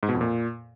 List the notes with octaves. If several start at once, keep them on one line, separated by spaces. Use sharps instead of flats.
G#2
B2
F2
A#2